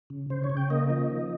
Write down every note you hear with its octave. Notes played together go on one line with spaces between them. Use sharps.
C#3
C#3 C5
C#5
C#3
G5
A#3 D#5
F3
D#3